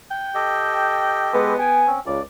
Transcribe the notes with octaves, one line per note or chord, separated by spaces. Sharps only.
G5
G4 A4 D#5
G#3 B3 B4
G5 G#5
C4 C#4
C#2 D5